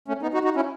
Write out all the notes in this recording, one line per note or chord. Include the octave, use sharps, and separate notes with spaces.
A3 C#4
B3 D#4
D#4 F#4
D#4 F#4
C#4 E4